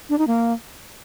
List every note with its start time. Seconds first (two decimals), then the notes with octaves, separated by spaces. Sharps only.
0.10 D4
0.18 D#4
0.27 A#3